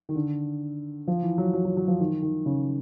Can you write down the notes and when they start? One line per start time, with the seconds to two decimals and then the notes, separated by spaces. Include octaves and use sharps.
0.09 D#3
0.15 D3
1.08 F3
1.23 E3
1.38 F#3
1.53 F#3
1.65 F#3
1.77 F#3
1.88 F3
2.00 D#3
2.23 D#3
2.46 C#3